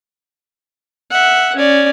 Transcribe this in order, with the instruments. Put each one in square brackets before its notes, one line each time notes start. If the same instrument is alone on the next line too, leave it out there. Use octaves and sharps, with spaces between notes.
[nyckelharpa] E5 F#5
C#4 D5